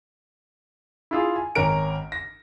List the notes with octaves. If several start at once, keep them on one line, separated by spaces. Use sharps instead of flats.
E4 F4 G#4
G#5
G#1 C#4 A#4 D7
A#6